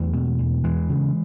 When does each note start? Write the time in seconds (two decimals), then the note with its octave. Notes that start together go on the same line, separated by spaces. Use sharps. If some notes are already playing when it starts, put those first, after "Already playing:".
Already playing: E2 F#3 A3
0.13 B2
0.39 E2
0.64 E2 E3 G#3
0.89 C#3